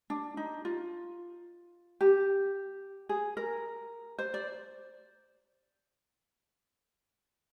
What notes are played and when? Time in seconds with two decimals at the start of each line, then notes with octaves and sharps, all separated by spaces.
0.10 D4
0.37 D#4
0.65 F4
2.01 G4
3.09 G#4
3.37 A#4
4.18 C5
4.34 D5